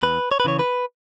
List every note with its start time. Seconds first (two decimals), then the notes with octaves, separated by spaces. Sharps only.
0.03 E2 B4
0.31 C#5
0.40 B4
0.45 C#3 E3 C#5
0.59 B4